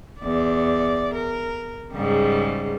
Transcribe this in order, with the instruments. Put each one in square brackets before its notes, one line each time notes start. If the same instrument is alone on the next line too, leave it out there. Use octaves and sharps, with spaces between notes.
[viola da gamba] E2 D5
A#4
G#2 C#3 G3